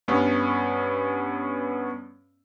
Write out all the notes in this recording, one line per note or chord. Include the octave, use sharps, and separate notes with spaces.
G2 B3 C#4